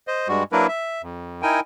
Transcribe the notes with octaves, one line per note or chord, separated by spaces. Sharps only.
C5 D#5
G2 G3 G#3 F#4
F#3 A#3 D4 E4 A#4 B4
E5
F2
D#4 E4 A#4 G5 G#5